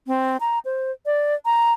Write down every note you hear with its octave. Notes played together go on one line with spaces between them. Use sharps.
C4
A#5
C5
D5
A#5